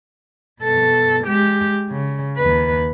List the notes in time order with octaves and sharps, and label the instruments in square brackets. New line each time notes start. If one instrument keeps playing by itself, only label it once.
[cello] B2 A4
G#3 G4
C#3
D#2 B4